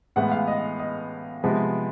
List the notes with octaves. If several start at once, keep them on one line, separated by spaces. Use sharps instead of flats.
A2 E3 G#3 B3 F#5
F5
D#5
D#5
C3 F3 G#3 B3